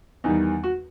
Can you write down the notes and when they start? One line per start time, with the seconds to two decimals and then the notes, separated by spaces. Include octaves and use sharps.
0.24 E2 D#3 G3 D#4
0.64 F#4